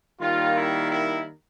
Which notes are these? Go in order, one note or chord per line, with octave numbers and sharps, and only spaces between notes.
D#3 G3 A#3 F4
E4
E4